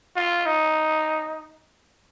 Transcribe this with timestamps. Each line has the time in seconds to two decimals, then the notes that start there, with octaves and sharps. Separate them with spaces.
0.16 F4
0.46 D#4